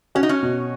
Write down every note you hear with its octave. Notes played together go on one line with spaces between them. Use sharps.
C#4 F#4
D#4
C#4
B2